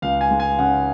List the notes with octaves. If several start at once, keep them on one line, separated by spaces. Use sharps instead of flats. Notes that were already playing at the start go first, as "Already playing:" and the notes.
C#2 F5
G#5
G#3
G#5
C#3 F#5